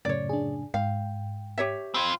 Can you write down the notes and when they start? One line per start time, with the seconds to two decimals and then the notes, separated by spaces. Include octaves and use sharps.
0.05 F#2 A2 C#3 C#5 D5
0.29 D4 G#4
0.74 G#2 F5 G5
1.58 G4 C#5 E5
1.94 C4 F4 B5